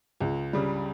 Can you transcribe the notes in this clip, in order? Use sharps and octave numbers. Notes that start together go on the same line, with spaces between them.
C#2
C#3 G3